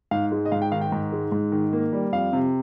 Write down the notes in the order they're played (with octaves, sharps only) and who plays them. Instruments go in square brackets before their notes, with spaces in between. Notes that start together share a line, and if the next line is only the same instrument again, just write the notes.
[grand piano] G#2 F5
G#3
D#5
G#2 F5
G5
D#3 F5
G5
G#2
G#3
G#2
D#3
A#3
G3
F2 F5
C3